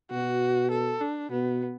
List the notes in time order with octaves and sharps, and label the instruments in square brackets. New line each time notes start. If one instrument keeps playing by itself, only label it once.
[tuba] B2 [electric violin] F#4
[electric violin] A4
D4
[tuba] B2 [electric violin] B3